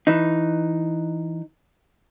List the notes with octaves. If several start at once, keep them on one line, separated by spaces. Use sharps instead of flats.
E3 D#4